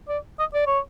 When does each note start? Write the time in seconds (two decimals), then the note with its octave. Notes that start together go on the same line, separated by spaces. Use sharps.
0.08 D5
0.39 D#5
0.54 D5
0.67 C#5